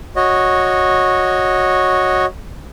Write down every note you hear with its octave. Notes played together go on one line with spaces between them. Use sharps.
F#4 C#5 D#5